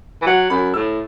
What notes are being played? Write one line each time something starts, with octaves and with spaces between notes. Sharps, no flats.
E3
F#3 F#5
F#2 B5
A2 E6